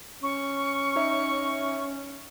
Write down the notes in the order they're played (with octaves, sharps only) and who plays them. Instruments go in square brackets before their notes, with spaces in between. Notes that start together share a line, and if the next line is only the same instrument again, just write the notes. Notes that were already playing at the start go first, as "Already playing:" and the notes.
[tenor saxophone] C#4 [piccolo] C#6
[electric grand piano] D#4 C#5 E5